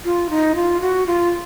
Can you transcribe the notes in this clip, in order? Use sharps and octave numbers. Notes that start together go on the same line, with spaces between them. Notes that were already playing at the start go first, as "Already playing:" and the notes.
F4
D#4
F4
F#4
F4